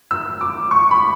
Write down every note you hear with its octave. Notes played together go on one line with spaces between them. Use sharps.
E6
D6
C#6
B5